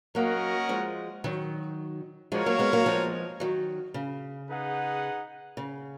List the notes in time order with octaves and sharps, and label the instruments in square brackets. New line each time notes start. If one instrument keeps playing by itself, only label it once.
[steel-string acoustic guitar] F#3 A#3 [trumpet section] C#4 F#4 A#4 D#5 F#5
[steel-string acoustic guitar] F3 G#3
D#3 F#3
[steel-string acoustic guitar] F3 G#3 [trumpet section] F#4 A#4 C#5 F5
[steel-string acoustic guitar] F#3 A#3
G#3 B3
F#3 A#3
F3 G#3
D#3 F#3
C#3
[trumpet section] D#4 G#4 B4 F#5
[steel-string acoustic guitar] C#3